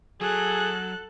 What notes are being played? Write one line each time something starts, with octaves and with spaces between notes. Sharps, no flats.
F#3 G#4 A4 F#6